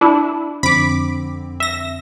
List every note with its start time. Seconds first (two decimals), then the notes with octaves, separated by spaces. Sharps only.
0.01 D4 E4
0.63 F2 D3 C4 B5 D6
1.60 E5 A#6